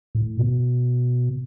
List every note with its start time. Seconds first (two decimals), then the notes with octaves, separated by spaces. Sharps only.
0.15 A2
0.39 B2